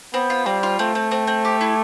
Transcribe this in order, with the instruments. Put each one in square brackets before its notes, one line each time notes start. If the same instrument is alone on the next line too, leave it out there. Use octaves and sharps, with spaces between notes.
[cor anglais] B3 [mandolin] C4
[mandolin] F4
[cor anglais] G3 [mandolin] C4
[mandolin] F4
[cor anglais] A3 [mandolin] C4
[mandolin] C4
C4
C4
G4
E4